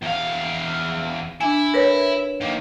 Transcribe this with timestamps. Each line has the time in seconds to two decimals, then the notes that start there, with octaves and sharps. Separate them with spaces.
0.02 E2 F5
1.41 D4 E4 G#5
1.74 A#4 B4 C#5
2.41 D#3 A#3